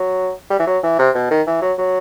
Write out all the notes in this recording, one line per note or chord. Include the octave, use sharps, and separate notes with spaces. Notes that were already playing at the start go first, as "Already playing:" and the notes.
Already playing: F#3
G3
E3
F#3
E3
C3
B2
D#3
E3
F#3
F#3